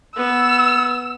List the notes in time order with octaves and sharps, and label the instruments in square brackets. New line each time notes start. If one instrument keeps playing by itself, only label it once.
[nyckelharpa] B3 [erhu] E6